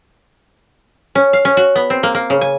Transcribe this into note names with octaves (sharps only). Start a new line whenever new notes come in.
C#4
F5
C#4
F#4
B3
C4
A#3
A#3
C#3
G#5